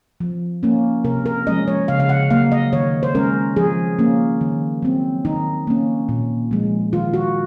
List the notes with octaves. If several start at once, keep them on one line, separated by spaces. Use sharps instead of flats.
F3
A#3 C#4
C3 A#4
A#4
F3 G#3 C#4 D#5
C#5
C#3 F5
F5
F#5
F#3 A#3 F5
D#5
D#3 C#5
C5
G#3 C#4 A#4
F3 G#4
A#3 C#4
D#3
F#3 C4
D#3 D#4
A#3 C#4
A#2
F3 G#3
D#3 F4
F#4